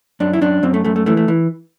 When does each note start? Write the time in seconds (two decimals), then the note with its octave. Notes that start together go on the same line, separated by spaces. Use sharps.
0.20 F#2 D4
0.33 E4
0.41 F#2 D4
0.63 F#2 C4
0.74 A3
0.85 F#2 A3
0.96 A3
1.06 E3 A3
1.17 A3
1.28 E3